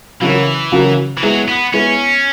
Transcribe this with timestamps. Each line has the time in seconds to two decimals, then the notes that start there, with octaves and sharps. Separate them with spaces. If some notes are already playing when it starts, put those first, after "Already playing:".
0.21 C#3 E3 F#3 C#4 F#4 A#4
0.72 C#3 F#3 C#4 F#4 A#4
1.18 E3
1.23 F#3 G#3 B3 E4
1.48 B3
1.73 G#3 B3 C#4 E4